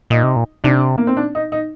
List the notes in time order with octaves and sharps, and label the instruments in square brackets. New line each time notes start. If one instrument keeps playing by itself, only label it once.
[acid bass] A#2 [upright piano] D#4
[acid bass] C3
A#2
[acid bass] C3 [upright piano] D4
[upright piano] A#3
C4
D4
D#4
D#4